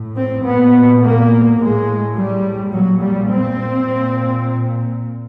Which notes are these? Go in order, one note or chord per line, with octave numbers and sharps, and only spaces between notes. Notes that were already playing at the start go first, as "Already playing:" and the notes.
Already playing: A2
C4
A#2 B3
A#3
A2 G#3
G3
A#2 F#3
G3
C4
A#2